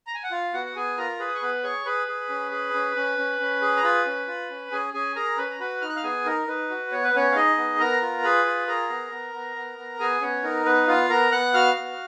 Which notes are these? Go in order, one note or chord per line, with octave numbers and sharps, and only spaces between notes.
A#5
G#5
F#5
F4 F5
B3 F#4 F#5
F#5
B3 G#4 G#5
F4 A#4 A#5
G#4 B4 B5
D#6
C#6
B3 B4 B5
G#4 C#5 C#6
G#4 B4 B5
G#4
C#4
G#4
C#4
C#4
C#4
C#4
G#4
A#5
F4 B4 B5
C#4
F4
C#4
C#4 G#4 G#5
C#4 G#4 G#5
G#4 A#4 A#5
C#4 B4 B5
A#5
F#4 B4 B5
D#4 F6
F#6
F5 F6
B3 G#4 G#5
D#4 A#4
D#4 B4
F#4
B3 C#5
B4
B3 C#4 C#5
F5
D#4 G#4 D#5
B3
B3 A#4 A#5
F4
G#4 B4 B5
F4
G#4 A#4 A#5
B3
B3
B3
B3
B3
B3 G#4 G#5
B3 C#4 C#5
D#4 A#4
B3 B4
B3 F4 F5
B3 A#4 A#5
B3 F#5 F#6
F#4 F5 F6
B3